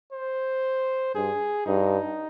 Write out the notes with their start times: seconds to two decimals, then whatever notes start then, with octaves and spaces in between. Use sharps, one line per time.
0.12 C5
1.15 G2 G#4
1.66 G2 D#4